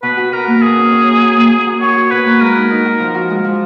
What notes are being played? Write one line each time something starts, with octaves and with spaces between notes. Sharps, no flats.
B2 B4
F#4
F#4 A#4
A#3
B2 G#4
C#4
C#4
A#3
F#4
A#3
A#3
F#4
F#4 C#5
F#4
B2 B4
A#3
G#3 A#4
D#4
D#4
F#4
F3
F#4
G#3
F3